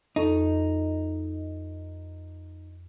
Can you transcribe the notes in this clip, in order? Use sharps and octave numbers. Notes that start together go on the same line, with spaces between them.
F2 D#4 A4 C#6